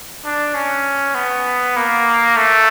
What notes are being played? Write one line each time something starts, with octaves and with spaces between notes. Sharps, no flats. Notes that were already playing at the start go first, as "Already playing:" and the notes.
D4
C#4
B3
A#3
A3